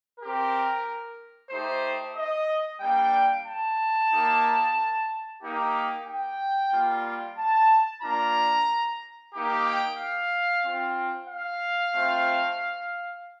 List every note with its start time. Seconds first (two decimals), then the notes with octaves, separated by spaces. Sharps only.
0.20 C4 G4 A#4
1.50 A3 D#4 G4 C5
2.15 D#5
2.81 G3 A#3 D4 G5
3.46 A5
4.12 A#3 D#4 G4
5.43 A#3 D#4 G4
6.07 G5
6.72 G3 A#3 F4
7.37 A5
8.03 A#3 D4 F4 A#5
9.34 A#3 D#4 G4
9.65 G5
9.99 F5
10.64 C4 F4
11.29 F5
11.94 A3 C4 F4